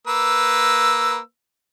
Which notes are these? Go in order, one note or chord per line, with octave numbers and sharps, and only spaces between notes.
A#3 B4 E6